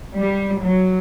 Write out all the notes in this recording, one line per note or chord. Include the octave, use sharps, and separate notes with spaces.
G3
F#3